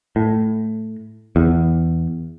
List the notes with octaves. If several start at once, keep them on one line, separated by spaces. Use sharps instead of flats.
A2
E2